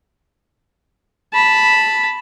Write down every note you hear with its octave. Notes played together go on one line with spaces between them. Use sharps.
A5 B5